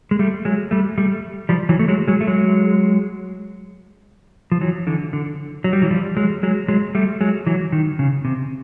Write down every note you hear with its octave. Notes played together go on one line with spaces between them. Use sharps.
G#3
G3 A3
F#3 G#3
G3 A3
G3 A3
F3 G3
E3 F#3
A3
F#3 G#3
F#3 G#3
A3
F#3 G#3
F3
E3 F#3
D3 E3
D3
F#3
G3
E3 F#3
F3 G3
F#3 G#3
F#3 G#3
F#3 G#3
G3 A3
F#3 G#3
E3 F#3
D#3
C#3
C3